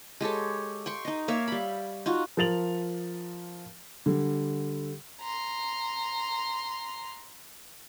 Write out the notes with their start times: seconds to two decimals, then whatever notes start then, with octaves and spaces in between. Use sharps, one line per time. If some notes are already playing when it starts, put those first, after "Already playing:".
0.21 G#3 G4 A4 C#5
0.86 G5 C6 C#6
1.05 D#4 D#5
1.28 A#3 C#5 E5 F5
1.48 G3 B5
2.06 D#4 F4 F#4
2.37 F3 A#4 A6 F7 F#7
4.06 D3 G3
5.21 A#5 C6